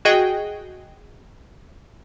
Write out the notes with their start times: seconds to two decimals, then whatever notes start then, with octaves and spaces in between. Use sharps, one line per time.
0.05 F#4 G#4 D#5 G5